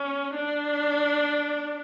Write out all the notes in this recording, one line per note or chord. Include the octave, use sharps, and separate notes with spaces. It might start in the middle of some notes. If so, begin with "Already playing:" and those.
Already playing: C#4
D4